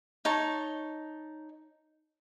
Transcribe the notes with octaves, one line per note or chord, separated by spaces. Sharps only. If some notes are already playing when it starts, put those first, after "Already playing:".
D#4 C#5 A5 C#6